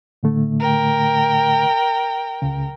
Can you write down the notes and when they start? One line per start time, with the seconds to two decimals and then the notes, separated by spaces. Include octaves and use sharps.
0.23 A2 D3 A3
0.59 A#4 G5
2.42 C#2 C#3